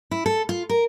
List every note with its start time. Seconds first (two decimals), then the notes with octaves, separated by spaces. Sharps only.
0.11 E4
0.26 A4
0.49 F4
0.69 A#4